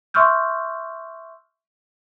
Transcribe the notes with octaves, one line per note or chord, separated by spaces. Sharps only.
E5 C6 C#6 E6 F6 G6